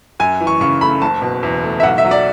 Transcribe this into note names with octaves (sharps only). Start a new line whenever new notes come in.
F#2 G#5
E3
C#6
C#3 C#6
A3 B5
F#1 A5
B2
E2
A3
E5
B1 F#5
E5
F#3
D5